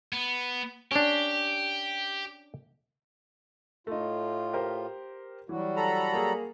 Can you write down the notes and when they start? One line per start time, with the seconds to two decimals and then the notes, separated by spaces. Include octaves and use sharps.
0.13 B3
0.91 C#4 D4 G4
3.87 A2 A3 D#4 F4
4.53 G4 A#4 C5
5.49 E3 F#3 G3 F#4
5.76 A4 A#5 B5
6.13 A#3 G#4